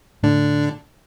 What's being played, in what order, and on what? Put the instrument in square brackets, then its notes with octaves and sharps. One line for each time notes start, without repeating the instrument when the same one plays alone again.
[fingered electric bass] A2 A3 [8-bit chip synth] D3 D4